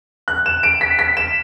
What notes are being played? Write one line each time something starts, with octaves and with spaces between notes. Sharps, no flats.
F#6
E7
D7
B6
B6
E7